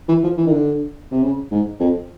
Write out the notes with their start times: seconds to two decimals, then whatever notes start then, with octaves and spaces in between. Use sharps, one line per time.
0.08 E3
0.23 F3
0.37 E3
0.47 D#3
0.51 D3
1.11 C3
1.23 C#3
1.51 G#2
1.80 F2